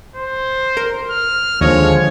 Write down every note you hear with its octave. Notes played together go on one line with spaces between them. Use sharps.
C5
A#4
F6
D#2 D3 F3 G#3 C#5 D#5